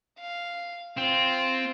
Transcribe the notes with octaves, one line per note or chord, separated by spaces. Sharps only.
F5
C4 F4 C5